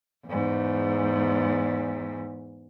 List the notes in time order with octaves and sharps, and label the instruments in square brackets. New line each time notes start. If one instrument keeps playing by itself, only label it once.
[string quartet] E2 G#2